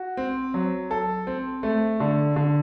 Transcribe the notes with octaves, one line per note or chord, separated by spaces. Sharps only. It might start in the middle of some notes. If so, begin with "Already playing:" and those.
Already playing: F#4
C4
F#3
A4
C4
A3
D3
D3